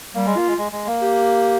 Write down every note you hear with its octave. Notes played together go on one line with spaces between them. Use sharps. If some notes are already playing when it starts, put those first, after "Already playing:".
G3 A#3
G#3
A#3 F4
G#3
G#3
G#3
A#3
G4